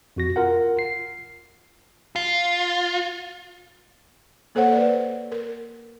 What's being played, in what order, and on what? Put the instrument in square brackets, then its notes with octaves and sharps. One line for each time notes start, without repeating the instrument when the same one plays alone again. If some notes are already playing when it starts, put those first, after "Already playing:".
[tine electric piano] F2 F#4 A#6
F4 A#4 F#5
C7
[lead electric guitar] F4
[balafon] A#3 A4 C5 C#5 F#5
B4 D5
A#4